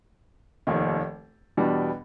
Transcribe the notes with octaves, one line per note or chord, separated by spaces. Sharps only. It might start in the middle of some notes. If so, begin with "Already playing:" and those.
F1 D#2 D#3
E2 B2 G3 B3 D4